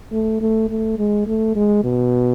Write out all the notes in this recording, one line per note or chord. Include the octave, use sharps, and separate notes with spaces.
A3
A3
A3
G#3
A3
G#3
B2